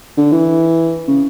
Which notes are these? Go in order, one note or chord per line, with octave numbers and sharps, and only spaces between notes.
D3
E3
C#3